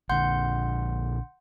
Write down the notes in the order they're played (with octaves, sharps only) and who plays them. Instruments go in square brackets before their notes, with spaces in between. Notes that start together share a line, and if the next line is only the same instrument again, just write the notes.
[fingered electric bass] A#1 D3 [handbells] F#5 C6 G6